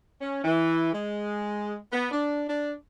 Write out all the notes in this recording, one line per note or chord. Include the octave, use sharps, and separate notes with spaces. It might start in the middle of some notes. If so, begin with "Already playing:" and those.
C#4
E3
G#3
B3
D4
D4